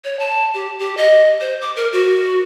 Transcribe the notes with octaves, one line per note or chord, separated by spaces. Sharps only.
C#5
A5
G4
G4
D#5
C5
D6
A#4
F#4